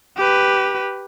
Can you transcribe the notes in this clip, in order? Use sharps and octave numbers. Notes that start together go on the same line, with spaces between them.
G4 B4